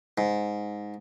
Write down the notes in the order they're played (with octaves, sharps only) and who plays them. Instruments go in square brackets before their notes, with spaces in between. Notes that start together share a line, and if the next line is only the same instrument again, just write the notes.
[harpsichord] G#2